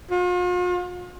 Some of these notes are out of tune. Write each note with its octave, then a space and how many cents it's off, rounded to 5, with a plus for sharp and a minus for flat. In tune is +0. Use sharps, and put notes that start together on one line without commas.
F4 +45